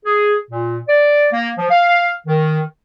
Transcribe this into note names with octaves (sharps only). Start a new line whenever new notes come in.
G#4
A#2
D5
A#3
F3
F5
D#3